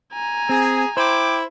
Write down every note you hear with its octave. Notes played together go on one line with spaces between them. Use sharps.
G#5 A#5
C4 G#4
E4 C5 G5 D6